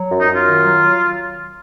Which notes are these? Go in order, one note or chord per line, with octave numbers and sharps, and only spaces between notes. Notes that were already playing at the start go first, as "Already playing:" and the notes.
Already playing: F#3
F#2
D#4
F#2 F4
D#3
F#3